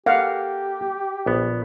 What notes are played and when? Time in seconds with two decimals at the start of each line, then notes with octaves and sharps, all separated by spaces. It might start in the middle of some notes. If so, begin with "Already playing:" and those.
0.06 A#3 G4 A4 A#4 F5 F#5
1.26 A#1 B3